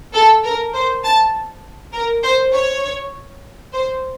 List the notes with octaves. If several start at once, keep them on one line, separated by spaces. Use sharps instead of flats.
A4
A#4
C5
A5
A#4
C5
C#5
C5